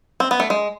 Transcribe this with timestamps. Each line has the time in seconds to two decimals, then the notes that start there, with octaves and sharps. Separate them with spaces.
0.20 C4
0.31 B3
0.40 A3
0.50 G#3